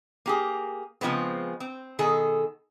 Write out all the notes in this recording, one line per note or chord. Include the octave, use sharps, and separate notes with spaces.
A#3 G4 G#4
C#3 F3 G#3 B3 C4
C4
B2 D#3 G#4 A4